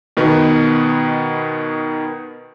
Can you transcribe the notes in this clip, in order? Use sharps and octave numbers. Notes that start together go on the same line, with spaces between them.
B2 D#3 B3